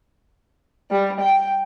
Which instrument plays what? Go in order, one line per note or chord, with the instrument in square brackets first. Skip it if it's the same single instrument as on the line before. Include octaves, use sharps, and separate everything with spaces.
[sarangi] G3
G5